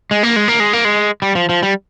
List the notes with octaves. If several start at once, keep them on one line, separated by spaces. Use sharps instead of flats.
G#3
A#3
G#3
A#3
G#3
A#3
G#3
G3
F3
F3
G3